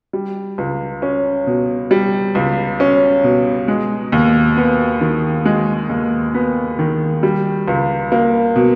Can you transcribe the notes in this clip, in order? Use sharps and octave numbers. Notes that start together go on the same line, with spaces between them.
G3
C#2
C#4
B2
G3
C#2
C#4
B2
G#3
D#2
B3
D#3
G#3
D#2
B3
D#3
G3
C#2
A#3
B2